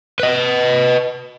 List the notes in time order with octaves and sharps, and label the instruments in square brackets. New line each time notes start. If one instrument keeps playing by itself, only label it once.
[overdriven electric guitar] B4 D#5